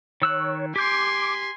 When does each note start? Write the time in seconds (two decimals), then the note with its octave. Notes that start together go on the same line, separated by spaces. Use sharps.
0.22 D#3 C#5 E6 F#6
0.76 G4 G#5 C6 D6 G6